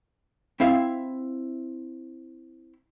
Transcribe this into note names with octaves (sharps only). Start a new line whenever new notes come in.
C4 E4 E5 F5